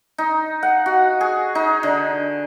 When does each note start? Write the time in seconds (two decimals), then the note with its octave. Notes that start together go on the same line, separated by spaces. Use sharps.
0.18 D#4
0.63 F#5
0.86 F#4
1.21 G#4
1.55 D#4
1.83 D3